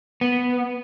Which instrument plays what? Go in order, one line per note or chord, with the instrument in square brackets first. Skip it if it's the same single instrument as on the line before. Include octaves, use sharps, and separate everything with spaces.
[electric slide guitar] B3